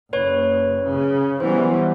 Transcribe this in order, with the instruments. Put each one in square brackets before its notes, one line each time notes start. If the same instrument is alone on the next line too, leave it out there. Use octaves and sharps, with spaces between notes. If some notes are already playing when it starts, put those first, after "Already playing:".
[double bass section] F#1 [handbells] B4 C#5
[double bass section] C#3
[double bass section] E3 F#3 G3 [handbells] B3 C5